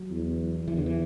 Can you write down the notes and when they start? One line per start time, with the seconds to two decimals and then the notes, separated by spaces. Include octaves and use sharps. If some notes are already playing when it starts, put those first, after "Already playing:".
Already playing: F#3
0.11 E2
0.68 E2 E3
0.77 D3
0.86 E3